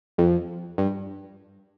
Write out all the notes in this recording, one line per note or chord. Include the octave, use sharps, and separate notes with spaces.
F2
G2